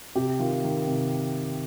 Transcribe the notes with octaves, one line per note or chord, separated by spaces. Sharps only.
C3 G4
D#3 F4
D#3
C3